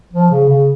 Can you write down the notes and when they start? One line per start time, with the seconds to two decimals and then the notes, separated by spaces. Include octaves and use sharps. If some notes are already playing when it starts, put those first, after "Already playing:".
0.13 F3
0.31 C#3
0.49 C#3